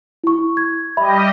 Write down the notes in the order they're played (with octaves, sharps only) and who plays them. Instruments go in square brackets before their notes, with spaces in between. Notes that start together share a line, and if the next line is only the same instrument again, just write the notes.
[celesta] E4 C#6
G#6
[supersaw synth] G3 G4 D#5 [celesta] E5 B5